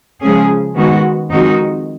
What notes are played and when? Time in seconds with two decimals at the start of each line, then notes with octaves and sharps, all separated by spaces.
0.21 C#3 F3 G#3 C#4 G#4
0.76 D#3 G#3 B3 F#4
1.31 F2 D#3 G#3 D#4 F#4